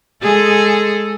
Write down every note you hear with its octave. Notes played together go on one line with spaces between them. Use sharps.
G#3 G#4 A4